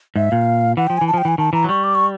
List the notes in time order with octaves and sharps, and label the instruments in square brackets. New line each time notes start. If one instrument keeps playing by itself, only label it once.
[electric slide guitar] G#2 [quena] E5
[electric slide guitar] A#2 [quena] F5
[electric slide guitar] E3 [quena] F#5
[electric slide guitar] F3 [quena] G5
[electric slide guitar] E3 [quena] G#5
[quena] A5
[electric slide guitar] F3 [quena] G5
[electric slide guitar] E3 [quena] G#5
[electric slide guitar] D#3 [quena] A5
[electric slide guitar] E3 [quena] A#5
[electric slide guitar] F#3
[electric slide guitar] G3 [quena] C#6
[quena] D6
C#6